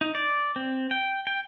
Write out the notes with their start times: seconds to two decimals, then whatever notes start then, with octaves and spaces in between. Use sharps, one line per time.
0.01 D#4
0.15 D5
0.56 C4
0.91 G5
1.27 G5